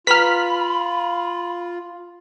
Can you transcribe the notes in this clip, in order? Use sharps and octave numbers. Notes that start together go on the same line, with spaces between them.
F4 B4 A#5 B5 F6 B6